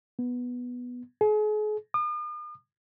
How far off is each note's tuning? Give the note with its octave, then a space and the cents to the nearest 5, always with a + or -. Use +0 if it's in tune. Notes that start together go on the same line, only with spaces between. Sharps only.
B3 -5
G#4 +40
D#6 -45